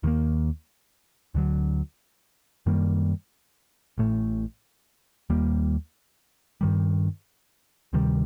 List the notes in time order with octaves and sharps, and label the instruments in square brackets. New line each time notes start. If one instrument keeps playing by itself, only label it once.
[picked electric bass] D#2 D#3 G3 A#3
D2 D3 F#3
F#2 D#3 G3 A#3
A1 A2 A3
D#2 D#3 G3 A#3
G2 D#3 G3
D2 C3 D#3 G3